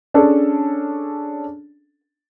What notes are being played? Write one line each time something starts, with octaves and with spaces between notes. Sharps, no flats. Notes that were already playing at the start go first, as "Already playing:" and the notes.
C#4 D4 G#4 A4 D5